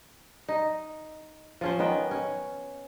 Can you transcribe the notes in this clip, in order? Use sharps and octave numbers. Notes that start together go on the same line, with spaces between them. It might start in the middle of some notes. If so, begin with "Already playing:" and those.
D#4
F3 C#4 C5
D#3 B3 C#4 G5
C#4